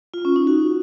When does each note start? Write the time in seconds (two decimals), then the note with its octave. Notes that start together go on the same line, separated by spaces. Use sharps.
0.14 F4
0.25 C#4
0.36 D#4
0.47 F#4